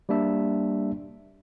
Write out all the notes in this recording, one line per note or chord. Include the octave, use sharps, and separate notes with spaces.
G3 A#3 D4 E5